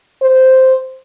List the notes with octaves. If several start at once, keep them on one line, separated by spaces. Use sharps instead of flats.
C5